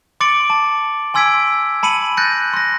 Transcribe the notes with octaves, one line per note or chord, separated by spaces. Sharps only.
C6 D6 A6 C#7 D7 F#7
A5
G#5 C6 E6 G#6 B6 D7
A5 B5 C#7 D#7 F#7
F#6 G6 A6 A#6 C#7 D#7
C6 A#6